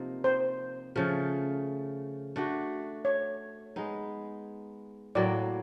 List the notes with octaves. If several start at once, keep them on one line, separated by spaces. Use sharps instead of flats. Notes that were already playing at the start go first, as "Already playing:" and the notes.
Already playing: C3 F3 A#3 D#4
C5
C#3 F3 A3
A3 D4 F#4
C#5
G#3 B3 D#4
A2 F#3 A#3 D5